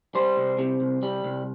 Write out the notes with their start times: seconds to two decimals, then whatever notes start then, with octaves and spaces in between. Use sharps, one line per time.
0.15 G3 C5
0.37 C2
0.59 C3
0.81 C2
1.03 G3
1.24 C2